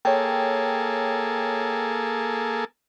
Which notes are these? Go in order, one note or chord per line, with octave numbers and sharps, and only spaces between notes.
A#3 G#4 A4 C#5 G5